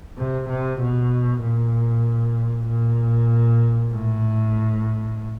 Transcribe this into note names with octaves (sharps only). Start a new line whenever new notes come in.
C3
C3
B2
A#2
A#2
A2